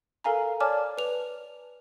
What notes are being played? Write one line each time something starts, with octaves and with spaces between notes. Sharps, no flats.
A4 A#4 F5 G#5 A#5
C#5 D5 G#5 A5 D6 F6
B4 F7